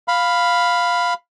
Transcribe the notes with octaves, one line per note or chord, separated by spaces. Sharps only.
F5 B5